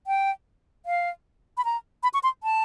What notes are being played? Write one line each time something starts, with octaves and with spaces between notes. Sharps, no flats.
G5
F5
B5
A#5
B5
C#6
C6
A5